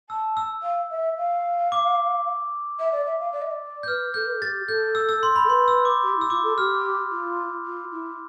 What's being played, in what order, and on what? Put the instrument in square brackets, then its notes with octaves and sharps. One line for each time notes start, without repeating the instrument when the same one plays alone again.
[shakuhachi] A5 [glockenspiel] E6
[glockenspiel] E6
[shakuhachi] F5
E5
F5
[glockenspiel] D6
[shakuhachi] E5
D5
E5
F5
D5
E5
D5
[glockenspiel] G6
[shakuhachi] B4 [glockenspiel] F6
[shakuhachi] A4 [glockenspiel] G6
[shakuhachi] B4
A4
[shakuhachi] G4 [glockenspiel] A6
[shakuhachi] A4 [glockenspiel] G6
[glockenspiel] E6
E6
C6
B5
[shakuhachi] A4
[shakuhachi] B4 [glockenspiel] C6
[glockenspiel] E6
D6
[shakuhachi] G4
E4
[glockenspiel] E6
[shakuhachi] F4 [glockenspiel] D6
[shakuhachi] A4
[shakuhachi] G4 [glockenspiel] F6
[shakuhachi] F4
F4
E4